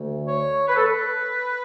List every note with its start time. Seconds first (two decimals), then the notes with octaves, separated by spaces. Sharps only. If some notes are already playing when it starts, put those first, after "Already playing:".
Already playing: D2 D3 A3
0.26 C#5
0.68 B4
0.76 A4
0.85 B4